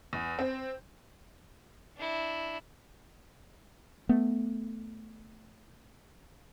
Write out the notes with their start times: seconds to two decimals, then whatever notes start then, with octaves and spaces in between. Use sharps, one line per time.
0.13 E2
0.39 C4
1.97 D4 E4
4.09 A3 B3